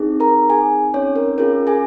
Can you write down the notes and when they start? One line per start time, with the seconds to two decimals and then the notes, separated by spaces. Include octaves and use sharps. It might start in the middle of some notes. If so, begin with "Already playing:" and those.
Already playing: C4 D#4 G#4
0.20 A#4 A#5
0.49 G#4 G#5
0.94 C#4 C#5
1.16 A#4
1.38 C#4 F4 G#4 A#4
1.67 G#4 G#5